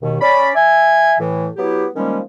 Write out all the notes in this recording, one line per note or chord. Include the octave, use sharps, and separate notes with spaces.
D#2 B2 D#3
C#4 D5 B5
E5 G#5
A2 E3
F#3 B3 E4 G4
D#3 F3 G3 G#3 A#3 C#4